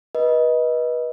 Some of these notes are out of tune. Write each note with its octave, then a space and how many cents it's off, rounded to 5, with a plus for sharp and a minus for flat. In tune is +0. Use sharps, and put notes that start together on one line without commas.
B4 -30 D#5 +10